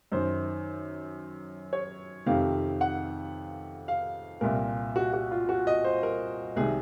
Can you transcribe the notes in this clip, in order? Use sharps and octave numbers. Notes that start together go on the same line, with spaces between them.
F#2 D#3 C5
C#5
F2 C3 D#3 F5
F#5
F5
C2 A#2 A#4
F#4
F#4
F4
F#4
D#5
C5
A#4
C2 C3 D#3 G#4